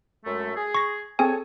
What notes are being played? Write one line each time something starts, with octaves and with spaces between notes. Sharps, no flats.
F#2 G#3 A3
G#4
C#6 A#6
C4 G#4 A4 C#5 G#5